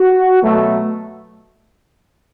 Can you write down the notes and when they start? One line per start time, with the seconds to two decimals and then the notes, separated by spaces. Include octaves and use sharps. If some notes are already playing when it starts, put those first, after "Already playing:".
Already playing: F#4
0.43 B2 F#3 A3